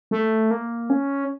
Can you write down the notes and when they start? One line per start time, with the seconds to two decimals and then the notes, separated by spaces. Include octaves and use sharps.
0.11 A3
0.51 A#3
0.90 C#4